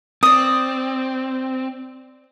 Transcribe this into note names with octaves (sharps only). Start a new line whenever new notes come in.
C4 D5 D#6